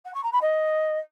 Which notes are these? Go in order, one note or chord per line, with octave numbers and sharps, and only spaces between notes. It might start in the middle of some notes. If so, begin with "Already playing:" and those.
F#5
C#6
A#5
B5
D#5